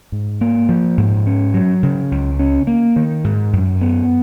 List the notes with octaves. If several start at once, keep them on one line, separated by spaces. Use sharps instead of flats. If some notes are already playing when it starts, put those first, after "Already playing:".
G#2
A#3
F3
G#2
C#4
F#3
C#3
C#2
C#4
A#3
D#3
G#2
F#2
B3